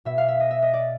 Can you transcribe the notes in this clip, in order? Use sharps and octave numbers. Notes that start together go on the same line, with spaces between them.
B2 E5
F5
E5
D#5
E5
D#5
D5